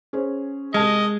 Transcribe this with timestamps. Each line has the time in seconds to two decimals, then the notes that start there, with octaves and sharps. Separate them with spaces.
0.13 C#4 G#4 C5
0.74 C2 G#3 D#5 A5 F6